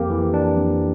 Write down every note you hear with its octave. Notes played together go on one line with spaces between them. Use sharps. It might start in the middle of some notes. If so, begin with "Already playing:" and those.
Already playing: F2 A#3 G4
E3
D4
F2